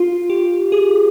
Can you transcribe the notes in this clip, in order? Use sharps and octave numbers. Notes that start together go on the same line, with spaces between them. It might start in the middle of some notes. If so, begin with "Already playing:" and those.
Already playing: F4
G4
G#4